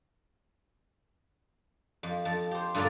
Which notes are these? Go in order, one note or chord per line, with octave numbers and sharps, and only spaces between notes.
F2
F2 A5
G4 C5
G2 A#2 D3 F4 A#4 D5